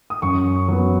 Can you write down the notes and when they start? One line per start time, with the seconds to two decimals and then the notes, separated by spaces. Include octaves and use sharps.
0.10 D#6
0.22 F#2 C#6
0.68 F#3 B3